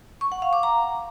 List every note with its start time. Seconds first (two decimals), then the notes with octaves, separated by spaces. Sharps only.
0.21 C#6
0.32 F#5
0.42 F5
0.53 D6
0.63 A#5